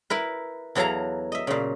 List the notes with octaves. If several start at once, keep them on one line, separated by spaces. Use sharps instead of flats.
E4 A#4 B4
E2 E3 F#3 A4 F5 A#5
D#5 E5
A#2 C#3